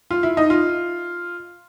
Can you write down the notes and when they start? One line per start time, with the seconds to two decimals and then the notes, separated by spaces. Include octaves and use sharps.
0.11 F4
0.23 E4
0.37 D#4
0.50 F4